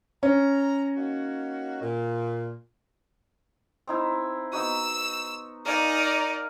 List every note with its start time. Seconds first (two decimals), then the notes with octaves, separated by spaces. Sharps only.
0.23 C#4 A#5
0.96 A#3 D#4 F#4
1.80 A#2
3.87 C4 D#4 E4
4.53 B3 D#4 F#4 E6
5.65 D#4 A#4 D5 F5 G#5